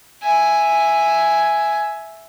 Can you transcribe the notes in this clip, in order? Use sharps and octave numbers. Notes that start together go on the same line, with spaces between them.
E5 G#5